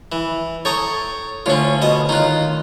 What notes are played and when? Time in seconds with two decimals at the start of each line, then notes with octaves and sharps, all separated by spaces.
0.12 E3
0.65 A4 C#5 G5 A#5 C#6 D#6
1.46 D2 D3 C#4 F4 C#5
1.82 B2 D#5
2.09 D#3 D#4 F4 F#6